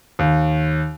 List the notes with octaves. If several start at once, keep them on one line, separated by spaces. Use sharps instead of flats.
D#2